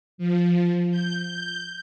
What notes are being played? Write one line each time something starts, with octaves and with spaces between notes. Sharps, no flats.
F3
G6